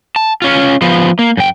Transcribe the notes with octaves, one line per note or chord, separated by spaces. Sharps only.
A5
C#4 F4
F3 B3
A#3
F#2 G5